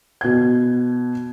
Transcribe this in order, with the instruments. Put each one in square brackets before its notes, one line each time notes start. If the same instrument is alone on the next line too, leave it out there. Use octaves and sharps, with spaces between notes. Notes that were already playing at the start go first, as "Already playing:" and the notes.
[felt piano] B2 G#6